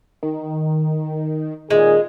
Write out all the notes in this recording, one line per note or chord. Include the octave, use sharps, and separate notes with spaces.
D#3
A#2 D#3 G#3 G#4